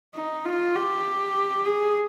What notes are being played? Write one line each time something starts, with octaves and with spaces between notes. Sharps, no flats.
D#4
F4
G4
G#4